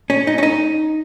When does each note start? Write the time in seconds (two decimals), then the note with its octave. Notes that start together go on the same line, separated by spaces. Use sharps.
0.10 C#4
0.27 D#4
0.38 C#4
0.43 D#4